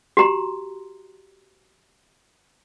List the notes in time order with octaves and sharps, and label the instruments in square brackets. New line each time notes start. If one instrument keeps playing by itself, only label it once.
[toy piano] F#4 G4 A#5 C6